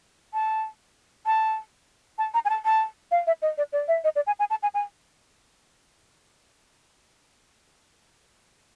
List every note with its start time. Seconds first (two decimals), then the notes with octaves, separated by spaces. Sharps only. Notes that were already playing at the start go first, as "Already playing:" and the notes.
0.34 A5
1.26 A5
2.18 A5
2.34 A#5
2.45 G#5
2.50 A5
2.65 A5
3.11 F5
3.27 E5
3.42 D#5
3.58 D5
3.73 D5
3.88 E5
4.04 D#5
4.16 D5
4.27 G#5
4.39 G#5
4.50 A5
4.63 G#5
4.74 G#5